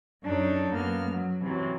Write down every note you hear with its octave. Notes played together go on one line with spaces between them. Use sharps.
F#2 D4 D#4 A4 C#5
F#2 A#3 B3 F6
F#3
C3 E3 F#3